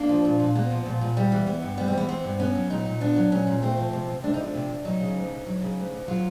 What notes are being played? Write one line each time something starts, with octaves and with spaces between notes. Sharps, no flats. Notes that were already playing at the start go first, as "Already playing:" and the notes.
Already playing: A#3 D4
F3
A#2
A#2
A#3 B3
F3
A#2
A#2
G3
E3
B3
G2
G3 B3
C4
E3 B3
B3 C4
G2
B3 C#4
F#3
A#2 D#4
A#2
B3 D4
F#3
A#2 C#4
A#2
A3 C4
F3
C3
C3
A3 D4
D#4
F3 D4
C3
C3
F#3 D#4
C#3
D2
D2
F#3
C#3
D2
D2
F#3 F4